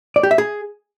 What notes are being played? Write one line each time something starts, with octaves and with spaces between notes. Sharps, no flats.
D5
G4
E5
G#4